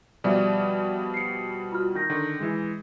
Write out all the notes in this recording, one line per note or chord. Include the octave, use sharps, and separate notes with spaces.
B2 F3 G3 D5 E5
C7 C#7
F4 F#4 F6
D#3 G6 A#6
D3 D#3
E3 G#3